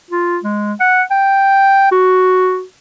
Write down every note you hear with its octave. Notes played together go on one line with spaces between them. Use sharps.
F4
G#3
F#5
G5
F#4